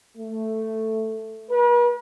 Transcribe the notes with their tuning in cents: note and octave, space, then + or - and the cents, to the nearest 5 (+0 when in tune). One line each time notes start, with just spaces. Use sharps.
A3 +5
B4 -45